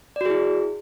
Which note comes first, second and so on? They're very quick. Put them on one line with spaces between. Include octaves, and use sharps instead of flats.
D5 F#4 G#4 E4